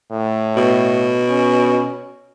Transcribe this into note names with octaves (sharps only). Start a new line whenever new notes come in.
A2
B2
C#4